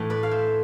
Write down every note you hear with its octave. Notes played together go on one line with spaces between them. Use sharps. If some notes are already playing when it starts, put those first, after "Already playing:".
Already playing: A2 E3 A3
B4 D5
F5
C5 E5